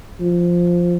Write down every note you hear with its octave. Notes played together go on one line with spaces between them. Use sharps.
F3